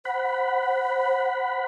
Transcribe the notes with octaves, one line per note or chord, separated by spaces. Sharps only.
C5 F#5 B5